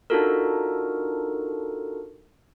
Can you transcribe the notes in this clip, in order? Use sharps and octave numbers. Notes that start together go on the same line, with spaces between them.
D4 D#4 F4 F#4 A4 A#4